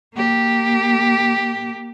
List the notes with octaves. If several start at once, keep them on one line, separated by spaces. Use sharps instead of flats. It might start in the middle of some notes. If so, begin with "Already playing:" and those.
A#3 G4